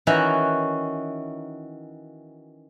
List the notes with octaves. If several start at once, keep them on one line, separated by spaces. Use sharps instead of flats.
D#3 E3 C#4 F#4 E5 A#5